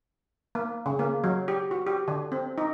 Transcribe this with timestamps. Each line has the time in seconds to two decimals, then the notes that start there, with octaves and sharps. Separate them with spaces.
0.55 A#3
0.86 C#3
0.99 A#3
1.24 F#3
1.48 G4
1.71 F#4
1.87 G4
2.08 D3
2.32 C4
2.58 D#4